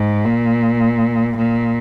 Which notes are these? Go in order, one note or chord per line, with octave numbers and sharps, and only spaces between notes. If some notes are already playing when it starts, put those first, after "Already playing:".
Already playing: G#2
A#2
A#2